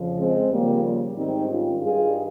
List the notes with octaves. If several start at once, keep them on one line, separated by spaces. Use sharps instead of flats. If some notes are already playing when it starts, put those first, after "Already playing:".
Already playing: F2 C#3 F3
G#3 C4
D#2 C#3 F3 G3 A#3
G3
G#2 D#3 G3 C4 D#4
C#4 F4
G2 D#3 G3 F4 G#4